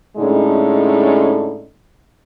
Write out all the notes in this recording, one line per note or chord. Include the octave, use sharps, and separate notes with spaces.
A2 D3 G#3 C#4 D#4